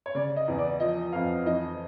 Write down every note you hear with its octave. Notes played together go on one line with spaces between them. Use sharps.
C#5
C#3 D5
D#5
E2
D5
F3 D#5
F2 F5
E3 D#5